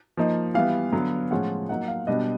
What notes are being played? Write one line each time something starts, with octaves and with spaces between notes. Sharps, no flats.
F3 A#3 D#4
E3 G3 B3 F5
D3 F#3 B3
A2 F3 G#3 C#4 F4 F#5
F#3 A#3 D#4 F#5
F5
B2 G3 B3 D4 D#5